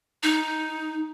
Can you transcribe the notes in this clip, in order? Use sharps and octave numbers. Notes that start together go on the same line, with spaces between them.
D#4